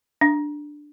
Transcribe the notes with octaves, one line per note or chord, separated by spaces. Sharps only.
D4